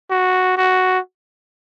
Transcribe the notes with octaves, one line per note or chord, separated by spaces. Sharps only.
F#4
F#4